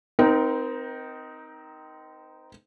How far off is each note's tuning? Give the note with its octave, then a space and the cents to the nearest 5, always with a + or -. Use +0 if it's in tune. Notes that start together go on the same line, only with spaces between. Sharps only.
C4 -20 D#4 +5 A#4 +20